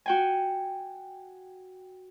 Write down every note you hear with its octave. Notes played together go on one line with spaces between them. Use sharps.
F#4 G5 G#5